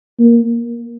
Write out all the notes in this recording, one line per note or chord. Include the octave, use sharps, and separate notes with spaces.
A#3